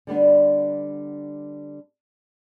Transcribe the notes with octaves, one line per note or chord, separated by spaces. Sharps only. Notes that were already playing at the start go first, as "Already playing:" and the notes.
D3 G3 B3 D4